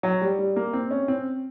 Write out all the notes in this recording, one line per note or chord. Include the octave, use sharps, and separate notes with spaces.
F#3
G3
G3
A#3
C4
C#4
C4